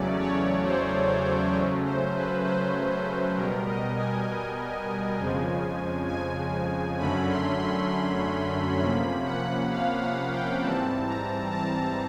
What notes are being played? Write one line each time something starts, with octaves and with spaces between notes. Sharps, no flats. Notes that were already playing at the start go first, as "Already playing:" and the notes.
Already playing: E2 C#3 F#3 A3 C#4 D5
C#5
C5
C5
C#3 F#3 A3 C#4
C5
B4
C5
C5
B2 G3 B3 A#4
D#5
G#5
F2 C#3 F3 G#3
G#5
F#2 D3 F#3 A3 C#4 B5
C6
C6
C6
C3 F3 A#3 C#4 B5
F#5
F5
F#5
G5
G#2 E3 G3 C4 A5
A#5
A5